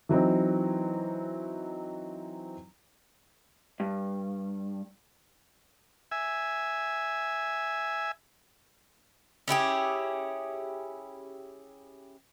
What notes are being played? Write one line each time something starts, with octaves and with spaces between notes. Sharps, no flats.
E3 F#3 C4 D#4
G2
E5 G#5
C#4 E4 G4 G#4